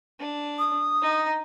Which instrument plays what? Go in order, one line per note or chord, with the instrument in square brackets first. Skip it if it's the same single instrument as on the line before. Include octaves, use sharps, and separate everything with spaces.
[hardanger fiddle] D4
[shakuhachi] D#6
[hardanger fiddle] D#4 A#5